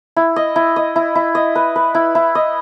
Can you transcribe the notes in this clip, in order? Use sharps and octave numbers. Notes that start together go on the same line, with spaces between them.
E4
D#5
E4
D#5
E4
E4
D#5
B4
B4
E4
E4
D#5